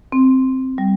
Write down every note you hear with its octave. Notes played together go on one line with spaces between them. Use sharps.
C4
G3